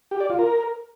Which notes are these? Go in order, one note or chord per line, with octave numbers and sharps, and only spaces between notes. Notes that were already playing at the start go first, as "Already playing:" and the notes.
G4
D5
F4
A#4